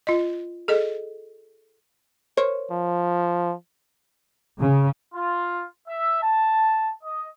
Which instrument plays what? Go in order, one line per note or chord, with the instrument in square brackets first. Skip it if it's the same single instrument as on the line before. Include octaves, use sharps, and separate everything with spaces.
[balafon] F4 D#5
G#4 A4 D#5
[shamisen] A#4 C5 C#5
[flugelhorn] F3
[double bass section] C#3
[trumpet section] F4
E5
A5
D#5